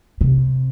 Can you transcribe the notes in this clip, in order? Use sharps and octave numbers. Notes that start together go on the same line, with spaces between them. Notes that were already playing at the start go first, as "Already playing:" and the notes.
C3